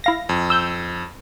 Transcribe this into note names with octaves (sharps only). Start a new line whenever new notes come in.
E4 F5 A#6
F2
E6 G6